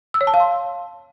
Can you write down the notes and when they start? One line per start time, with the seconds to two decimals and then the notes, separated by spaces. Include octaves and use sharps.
0.14 E6
0.21 C#5
0.27 A5
0.34 F5
0.40 C6